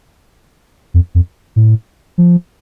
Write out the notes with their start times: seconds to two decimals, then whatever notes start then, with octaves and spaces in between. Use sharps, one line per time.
0.94 F2
1.15 F2
1.56 A2
2.18 F3